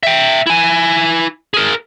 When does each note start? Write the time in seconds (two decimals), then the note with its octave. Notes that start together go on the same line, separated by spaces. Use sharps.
0.03 E5 G5
0.47 E4 G#5
1.54 G#4 A#4